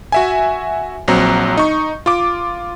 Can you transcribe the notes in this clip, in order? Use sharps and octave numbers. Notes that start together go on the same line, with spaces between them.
F#4 E5 G#5
A#1 F#3 C4 A#5
D#4 C#6
F4 D6